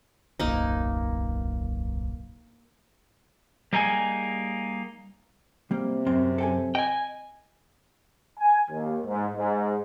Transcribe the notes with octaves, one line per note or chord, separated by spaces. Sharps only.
D1 B1 F#2 A#3 D#4
G3 A#3 D#4 G#4 G#5
C3 G3 A#3
F#2 C4
A4 G5 G#5
D#5 G5 G#5
G#5
D#2
G#2
G#2